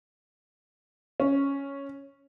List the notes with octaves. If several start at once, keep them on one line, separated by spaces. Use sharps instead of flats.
C#4